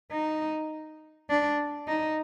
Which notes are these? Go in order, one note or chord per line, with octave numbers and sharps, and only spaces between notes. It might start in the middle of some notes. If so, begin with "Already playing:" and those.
D#4
D4
D#4